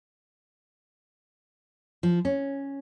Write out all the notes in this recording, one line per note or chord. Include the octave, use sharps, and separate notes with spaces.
F3
C#4